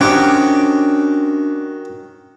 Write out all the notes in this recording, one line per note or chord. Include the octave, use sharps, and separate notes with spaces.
D#3 C#4 D4 F#4 G4 C5